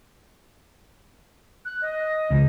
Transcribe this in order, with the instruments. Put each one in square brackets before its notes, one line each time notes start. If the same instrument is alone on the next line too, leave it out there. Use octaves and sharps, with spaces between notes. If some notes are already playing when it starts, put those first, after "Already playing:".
[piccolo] F#6
D#5
[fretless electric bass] C#2